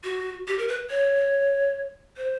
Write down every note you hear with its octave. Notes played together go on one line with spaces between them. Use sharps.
F#4
G4
A#4
B4
C#5
C5